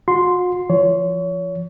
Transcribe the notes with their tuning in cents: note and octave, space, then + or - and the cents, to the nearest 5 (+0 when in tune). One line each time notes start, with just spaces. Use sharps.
F#4 -45 C6 +0
F3 -30 C#5 +25